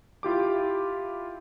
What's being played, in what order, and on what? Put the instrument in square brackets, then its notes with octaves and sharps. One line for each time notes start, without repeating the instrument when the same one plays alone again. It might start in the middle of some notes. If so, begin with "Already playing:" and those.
[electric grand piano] E4 F4 G4 D6